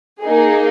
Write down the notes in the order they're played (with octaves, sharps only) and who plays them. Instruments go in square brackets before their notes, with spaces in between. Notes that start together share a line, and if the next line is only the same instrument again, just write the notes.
[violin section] A#3 D#4 G#4